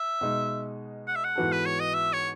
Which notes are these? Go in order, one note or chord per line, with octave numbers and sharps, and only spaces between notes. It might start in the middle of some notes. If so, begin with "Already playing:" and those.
Already playing: E5
B2 G#3 D#4
F#5
E5
F#5
G#2 E3 B3 F#4 A4
B4
C#5
D#5
E5
C#5